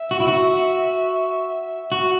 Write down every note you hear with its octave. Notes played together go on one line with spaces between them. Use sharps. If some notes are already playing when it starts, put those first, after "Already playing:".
Already playing: E5
F#4
E4
F#4
F#4